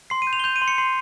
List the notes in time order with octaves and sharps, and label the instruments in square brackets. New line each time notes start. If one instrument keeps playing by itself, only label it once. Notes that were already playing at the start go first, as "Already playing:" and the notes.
[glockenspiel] C6 C7
D#7
G6
F7
G7
G6 F7
D#7
C6
C#7
C6 C7